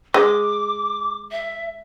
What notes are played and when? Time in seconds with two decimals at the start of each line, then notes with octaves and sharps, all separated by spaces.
0.14 G#3 D6
1.31 E5